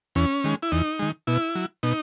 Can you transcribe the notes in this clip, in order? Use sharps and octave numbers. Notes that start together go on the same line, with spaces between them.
E2 C#4
D#3 G#3
E4
E2 D#4
D#3 G#3
B2 E4
F#3
B2 D#4